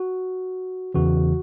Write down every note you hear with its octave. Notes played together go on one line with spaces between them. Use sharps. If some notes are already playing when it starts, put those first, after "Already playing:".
Already playing: F#4
E2 C#3 E3 F#4